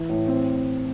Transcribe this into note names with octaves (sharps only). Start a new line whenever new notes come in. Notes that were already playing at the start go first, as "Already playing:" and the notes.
Already playing: E3
A2
C4